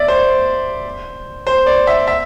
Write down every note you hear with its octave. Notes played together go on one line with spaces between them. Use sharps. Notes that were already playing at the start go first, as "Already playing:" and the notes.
Already playing: D5 E5
C5
C5
D5
E5
E5